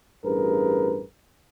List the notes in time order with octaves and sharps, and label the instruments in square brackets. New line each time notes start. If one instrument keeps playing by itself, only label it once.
[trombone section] A1 G2 G#4 A#4 B4